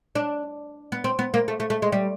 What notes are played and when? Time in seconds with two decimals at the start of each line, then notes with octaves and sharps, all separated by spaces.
0.15 D4
0.92 B3
1.04 C4
1.19 B3
1.34 A#3
1.48 A3
1.60 A3
1.70 A3
1.82 G#3
1.92 G3